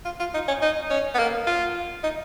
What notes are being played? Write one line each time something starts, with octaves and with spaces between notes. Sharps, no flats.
F4
F4
D#4
C#4
D#4
C#4
B3
A#3
F4
D#4